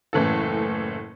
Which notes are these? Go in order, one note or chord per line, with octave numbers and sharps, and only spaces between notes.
F#1 A2 E3 C#4 A4